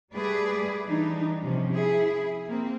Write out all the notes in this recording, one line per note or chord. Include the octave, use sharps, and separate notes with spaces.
G3 A3 G#4 B4 D5
E3 G3 D4 D#4
C3 F3 C#4
E4 G#4
A#3 C4